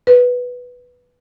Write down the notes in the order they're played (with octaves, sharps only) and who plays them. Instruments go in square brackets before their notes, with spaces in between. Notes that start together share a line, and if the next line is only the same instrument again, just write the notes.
[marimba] B4